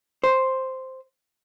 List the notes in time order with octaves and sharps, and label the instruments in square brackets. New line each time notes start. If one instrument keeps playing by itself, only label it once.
[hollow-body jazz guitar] C5